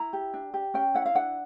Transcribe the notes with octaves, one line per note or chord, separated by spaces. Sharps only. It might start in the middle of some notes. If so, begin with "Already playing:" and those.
Already playing: E4 A#5
G4
D4
G4
C#4 G5
E4 F#5
F5
D4 F#5